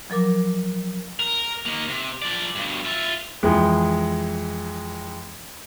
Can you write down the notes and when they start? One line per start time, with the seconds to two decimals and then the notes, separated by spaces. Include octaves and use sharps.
0.10 F3 F#3 A#4 D6
1.19 A#4
1.66 D#3 A#3
1.88 C3
2.22 F3 D5
2.55 G2 B2
2.85 F4 E5
3.43 F2 E3 G#3